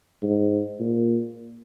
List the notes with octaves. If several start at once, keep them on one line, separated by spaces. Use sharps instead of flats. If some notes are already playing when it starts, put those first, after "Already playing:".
G#2
A#2